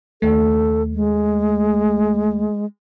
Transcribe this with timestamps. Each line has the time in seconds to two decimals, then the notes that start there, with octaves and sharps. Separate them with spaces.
0.22 D#2 A3 A4
0.93 G#3